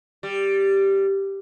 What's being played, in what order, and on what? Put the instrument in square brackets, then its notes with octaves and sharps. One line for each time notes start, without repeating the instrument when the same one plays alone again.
[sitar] G3